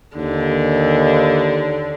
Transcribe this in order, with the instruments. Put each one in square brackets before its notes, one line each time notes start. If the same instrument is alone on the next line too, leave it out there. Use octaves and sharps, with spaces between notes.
[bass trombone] D#2 [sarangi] D3